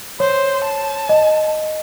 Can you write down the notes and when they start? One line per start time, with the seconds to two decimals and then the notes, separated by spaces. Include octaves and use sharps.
0.20 C5 C#5
0.64 A5
1.09 D#5